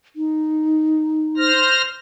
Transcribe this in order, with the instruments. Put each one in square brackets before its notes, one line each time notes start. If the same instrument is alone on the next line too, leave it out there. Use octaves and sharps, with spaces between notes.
[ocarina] D#4
[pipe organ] C5 F6 A#6